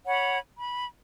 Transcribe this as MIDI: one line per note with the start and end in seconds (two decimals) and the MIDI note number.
0.06 0.38 73
0.06 0.38 78
0.06 0.38 83
0.58 0.85 83